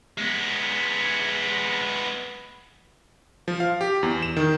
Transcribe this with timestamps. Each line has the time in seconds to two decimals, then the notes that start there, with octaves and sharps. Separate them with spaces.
0.18 G#3 B3
3.48 F3
3.60 F5
3.81 G4
4.03 E2
4.22 E7
4.37 D#3